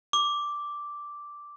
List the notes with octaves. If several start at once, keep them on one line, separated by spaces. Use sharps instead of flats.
D6